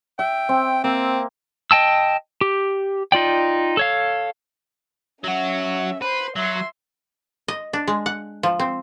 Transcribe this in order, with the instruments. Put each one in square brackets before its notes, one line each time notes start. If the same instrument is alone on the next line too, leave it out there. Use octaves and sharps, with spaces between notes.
[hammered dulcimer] E5 [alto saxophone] G5
[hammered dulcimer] C4
[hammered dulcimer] A#3 [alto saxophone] C4
[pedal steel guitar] D#5 G5 A5 E6
G4
D#4 F4 D5 G5
A4 C#5 F5
[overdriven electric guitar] F#3 F#4 [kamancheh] C#4 E5
[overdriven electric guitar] B4 [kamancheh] C5 C6
[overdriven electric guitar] F#3 [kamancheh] E5 C6
[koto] D#5
D4
G#3
F#5
F3
C4